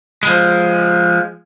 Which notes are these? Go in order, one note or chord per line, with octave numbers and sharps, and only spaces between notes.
F3 G#3